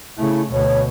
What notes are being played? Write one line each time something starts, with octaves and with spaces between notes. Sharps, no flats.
C#3 A3 E4
D2 B2 C#5